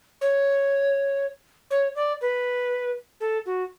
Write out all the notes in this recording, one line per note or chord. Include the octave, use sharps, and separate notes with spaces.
C#5
C#5
D5
B4
A4
F#4